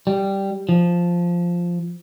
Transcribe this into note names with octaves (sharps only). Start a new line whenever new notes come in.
G3
F3